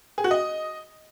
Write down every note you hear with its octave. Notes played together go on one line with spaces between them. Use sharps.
G#4
F#4
D#5